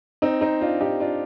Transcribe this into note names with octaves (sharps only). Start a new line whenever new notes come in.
C4 D#4
C4 D#4
D4 F4
D#4 G4
D4 F4